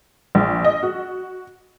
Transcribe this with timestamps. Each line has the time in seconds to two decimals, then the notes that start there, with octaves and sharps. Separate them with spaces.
0.35 A#1
0.64 D#5
0.83 F#4